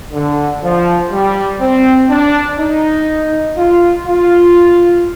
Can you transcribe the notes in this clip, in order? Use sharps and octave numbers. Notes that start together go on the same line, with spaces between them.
D3
F3
G3
C4
D4
D#4
F4
F4